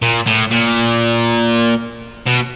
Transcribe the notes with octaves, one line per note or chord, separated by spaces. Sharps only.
A#2
A2
A#2
B2